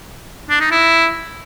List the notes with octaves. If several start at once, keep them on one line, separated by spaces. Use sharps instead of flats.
D4
D#4
E4